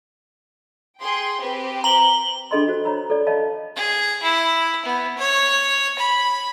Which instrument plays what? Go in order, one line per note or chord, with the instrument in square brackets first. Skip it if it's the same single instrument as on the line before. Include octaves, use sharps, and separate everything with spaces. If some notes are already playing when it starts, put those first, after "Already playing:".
[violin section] G#4 G5 C6
C4 G4 B4
[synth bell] A#5 F#7 G7
[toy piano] D4 G#4 A4 D#5 B5 C6
F#4 C5
C#5 A#5 B5
A4 C#5 D5
C#5 D#5 F5 A5 B5
[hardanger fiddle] G#4
E4
B3
C#5
B5